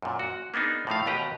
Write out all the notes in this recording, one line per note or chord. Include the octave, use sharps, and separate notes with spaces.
F#2 A#2
F#4
A#3 B3 D4 D#4 G#4
A2 F3 A3 F5
D#2 B2 G4 B4 A#5